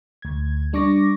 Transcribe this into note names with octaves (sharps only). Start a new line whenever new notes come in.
D2 G#6
G3 D4 C#6 D6 A#6